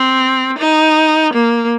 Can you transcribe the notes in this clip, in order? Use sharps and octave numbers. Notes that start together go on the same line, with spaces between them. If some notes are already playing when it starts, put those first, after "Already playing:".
Already playing: C4
D#4
A#3